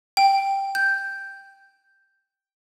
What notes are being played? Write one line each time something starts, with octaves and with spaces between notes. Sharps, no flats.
G5
G6